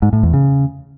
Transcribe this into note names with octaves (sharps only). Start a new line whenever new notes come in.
G#2
A2
E2
C#3